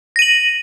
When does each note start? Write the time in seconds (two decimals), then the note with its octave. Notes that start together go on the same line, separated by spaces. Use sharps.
0.16 A#6
0.19 D#7
0.22 F#7